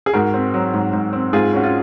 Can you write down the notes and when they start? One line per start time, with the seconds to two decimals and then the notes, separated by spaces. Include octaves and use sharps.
0.06 G#4
0.13 G#2 F#4 A#4
0.34 C4
0.54 F#3
0.73 G#2
0.93 G#2
1.13 C4
1.33 G#2 F4 G#4
1.53 C#4 F#4
1.64 F4